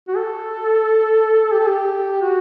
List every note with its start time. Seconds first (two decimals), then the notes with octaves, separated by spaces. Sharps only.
0.08 F#4
0.16 A4
1.53 G4
1.60 A4
1.68 G4
2.21 F#4